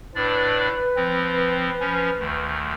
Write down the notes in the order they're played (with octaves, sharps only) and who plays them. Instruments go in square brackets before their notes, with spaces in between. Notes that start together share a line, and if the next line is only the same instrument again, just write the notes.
[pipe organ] A2 D4 D5 [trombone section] B4
[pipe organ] F3 C4
F3 C#4
D2 D#3